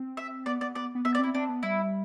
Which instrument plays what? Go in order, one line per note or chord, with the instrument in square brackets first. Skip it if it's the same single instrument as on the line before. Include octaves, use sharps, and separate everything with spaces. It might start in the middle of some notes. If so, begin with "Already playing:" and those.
Already playing: [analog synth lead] C4
[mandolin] E5
[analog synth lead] B3 [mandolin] D5
[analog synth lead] B3 [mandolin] D5
[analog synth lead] B3 [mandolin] D5
[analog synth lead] B3
[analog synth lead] B3 [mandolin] E5
[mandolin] D5
[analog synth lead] C4 [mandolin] E4
[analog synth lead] C4 [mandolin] D4
[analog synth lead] B3
[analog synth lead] G3 [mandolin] E4